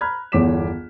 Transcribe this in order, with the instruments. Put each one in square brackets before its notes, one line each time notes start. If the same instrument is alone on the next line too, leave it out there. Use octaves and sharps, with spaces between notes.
[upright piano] A#5 B5 F6 F#6 G#6
G1 E2 C#5 D6 B6 E7